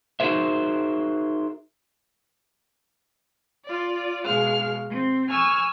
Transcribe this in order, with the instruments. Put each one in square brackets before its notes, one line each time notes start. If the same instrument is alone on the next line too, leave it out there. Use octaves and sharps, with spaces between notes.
[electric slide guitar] D#4 F#4 G#4 A#4 C5 E5
[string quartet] F4 D5
B2 G#3 F5 F6
C4
G#5 C#6 E6 F6